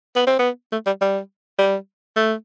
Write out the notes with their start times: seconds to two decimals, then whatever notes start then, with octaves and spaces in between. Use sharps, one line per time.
0.16 B3
0.27 C4
0.39 B3
0.72 A3
0.86 G3
1.01 G3
1.59 G3
2.16 A3